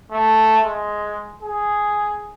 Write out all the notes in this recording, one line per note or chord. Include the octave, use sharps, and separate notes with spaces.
A3
G#3
G#4